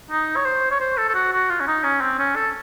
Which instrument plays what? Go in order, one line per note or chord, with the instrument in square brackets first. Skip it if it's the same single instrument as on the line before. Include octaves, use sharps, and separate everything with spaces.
[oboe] D#4
C#5
C5
C#5
C5
A4
A4
F#4
F#4
F4
C#4
D#4
C#4
C4
C#4
A4